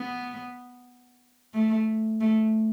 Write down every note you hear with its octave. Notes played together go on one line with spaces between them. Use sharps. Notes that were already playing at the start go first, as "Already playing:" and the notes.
Already playing: B3
A3
A3